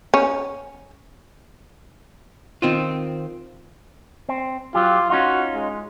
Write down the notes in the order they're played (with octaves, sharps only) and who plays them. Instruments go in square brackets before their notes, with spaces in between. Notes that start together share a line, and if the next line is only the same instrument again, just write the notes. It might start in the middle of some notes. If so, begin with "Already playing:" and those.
[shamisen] C#4
[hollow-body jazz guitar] D#3 C4 F4
[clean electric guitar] C4
[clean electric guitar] F#3 G4 [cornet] F4
[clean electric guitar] C#4 D#4 F4 [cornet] F#4
[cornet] G#3